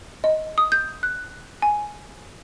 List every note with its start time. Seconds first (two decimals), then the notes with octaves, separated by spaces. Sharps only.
0.24 D#5
0.58 D#6
0.72 G6
1.03 F#6
1.62 G#5